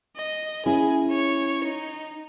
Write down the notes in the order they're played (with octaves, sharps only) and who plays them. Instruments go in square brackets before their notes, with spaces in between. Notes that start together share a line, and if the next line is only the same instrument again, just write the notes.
[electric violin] D#5
[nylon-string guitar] C#4 E4 [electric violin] G#4
[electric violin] C#5 C#7
D#4